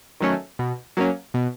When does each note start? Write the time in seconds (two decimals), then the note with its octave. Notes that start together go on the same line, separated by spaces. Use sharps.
0.20 D#3 F#3 A3 C#4
0.59 B2
0.97 F#3 A#3 C#4
1.34 B2